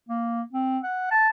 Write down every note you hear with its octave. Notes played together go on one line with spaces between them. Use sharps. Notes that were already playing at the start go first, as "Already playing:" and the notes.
A#3
C4
F#5
A5